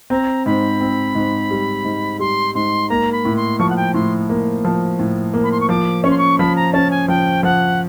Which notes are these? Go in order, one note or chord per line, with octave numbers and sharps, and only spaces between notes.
C4 A#5
G#2 B5
C4
G#2
G3
G#2
G3 C6
G#2 C6
A#3 A#5
B5
A2
C6
F3 C#6
F#5
G5
A2 C6
A#3
F3
A2
A#3
B5
C6
C#6
F3 D6
C#4 C#6
C6
C#6
F3 B5
A#5
C#4 A5
G#5
F3 G5
F3 F#5